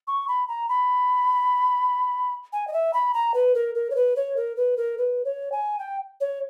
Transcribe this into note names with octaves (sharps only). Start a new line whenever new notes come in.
C#6
B5
A#5
B5
G#5
D#5
E5
B5
A#5
B4
A#4
A#4
C#5
B4
C#5
A#4
B4
A#4
B4
C#5
G#5
G5
C#5